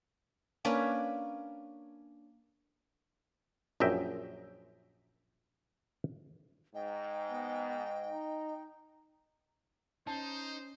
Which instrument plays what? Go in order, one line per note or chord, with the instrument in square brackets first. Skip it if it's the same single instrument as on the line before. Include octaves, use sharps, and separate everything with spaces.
[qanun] A#3 C#4 D4 B4
[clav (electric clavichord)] A#1 F#2 D#5 E5 G5
[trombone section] G#2 [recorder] D#5 [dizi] G5
[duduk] B3
D#4
[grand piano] C#4 [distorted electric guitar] D#4 [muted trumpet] C5 [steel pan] A5